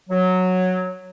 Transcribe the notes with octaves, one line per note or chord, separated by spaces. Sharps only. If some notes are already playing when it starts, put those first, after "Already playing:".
F#3